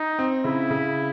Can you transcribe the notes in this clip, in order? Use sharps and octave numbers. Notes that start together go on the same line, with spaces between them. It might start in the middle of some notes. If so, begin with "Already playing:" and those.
Already playing: D#4
C4
C#3 E4
C#3